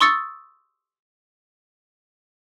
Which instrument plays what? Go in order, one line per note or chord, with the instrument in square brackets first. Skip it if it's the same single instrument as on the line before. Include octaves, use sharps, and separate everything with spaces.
[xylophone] C6 C#6 D#6 E6 A6 C#7